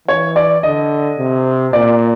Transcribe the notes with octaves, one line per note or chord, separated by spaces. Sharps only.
E3 C#5
D5
D3 D#5
C3
A#2 D5